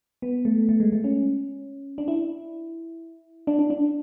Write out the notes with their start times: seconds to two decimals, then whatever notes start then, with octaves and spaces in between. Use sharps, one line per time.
0.22 B3
0.45 A3
0.69 A3
0.80 G#3
0.92 A3
1.04 C#4
1.98 D4
2.08 E4
3.47 D4
3.59 D4
3.70 D4